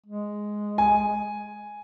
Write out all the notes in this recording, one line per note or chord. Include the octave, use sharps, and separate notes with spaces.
G#3
G#5